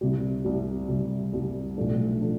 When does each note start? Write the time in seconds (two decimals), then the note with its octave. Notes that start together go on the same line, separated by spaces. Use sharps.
0.01 C2 C3 G3
0.45 C2 C3 G3
0.89 C2 C3 G3
1.33 C2 C3 G3
1.77 B1 A2 F3 A3 D4
2.21 A2 F3 A3 D4